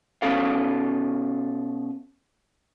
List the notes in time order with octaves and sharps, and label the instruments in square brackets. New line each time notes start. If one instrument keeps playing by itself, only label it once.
[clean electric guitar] B2 C#4 A4 F5